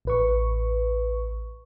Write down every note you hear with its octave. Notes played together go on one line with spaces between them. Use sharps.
A1 B4 C#6